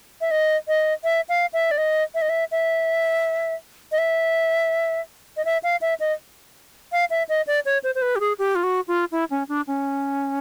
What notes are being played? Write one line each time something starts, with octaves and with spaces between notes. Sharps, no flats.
E5
D#5
D#5
E5
F5
E5
D5
D#5
E5
D#5
E5
E5
D#5
E5
D#5
E5
F5
E5
D#5
F5
E5
D#5
D5
C#5
C5
C5
B4
G4
G#4
G4
F4
F#4
F4
E4
C#4
D4
C#4